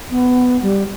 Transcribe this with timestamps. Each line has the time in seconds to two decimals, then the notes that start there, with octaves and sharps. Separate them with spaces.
0.11 B3
0.62 G3